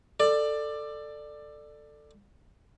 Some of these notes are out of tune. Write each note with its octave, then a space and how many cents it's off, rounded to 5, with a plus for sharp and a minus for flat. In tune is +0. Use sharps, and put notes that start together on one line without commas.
A4 +10 D5 +15